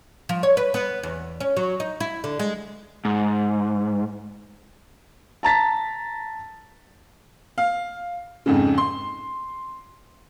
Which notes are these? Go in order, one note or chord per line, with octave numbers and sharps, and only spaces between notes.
F3
C#5
B4
B3
E2
C#4
F#3
D#4
E4
D3
G#3
G#2
A5 A#5 A6 B6
F5
F2 G#2 C#3
C6